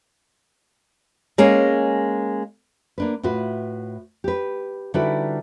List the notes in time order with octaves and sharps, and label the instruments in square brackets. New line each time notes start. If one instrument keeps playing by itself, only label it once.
[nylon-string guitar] G#3 A#3 C#4
A#3 D4 B4
A2 F4 F#4 B4
G4 B4
D3 G3 D#4 E4 F#4 B4